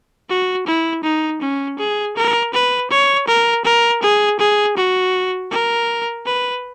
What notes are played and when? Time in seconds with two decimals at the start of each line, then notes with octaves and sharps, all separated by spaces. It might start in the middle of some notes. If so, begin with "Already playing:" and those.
0.29 F#4
0.67 E4
1.04 D#4
1.41 C#4
1.79 G#4
2.17 A#4
2.53 B4
2.91 C#5
3.28 A#4
3.65 A#4
4.03 G#4
4.39 G#4
4.77 F#4
5.52 A#4
6.26 B4